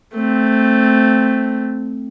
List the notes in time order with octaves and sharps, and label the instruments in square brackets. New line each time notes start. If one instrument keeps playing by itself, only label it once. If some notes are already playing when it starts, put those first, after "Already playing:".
[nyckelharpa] A3 C4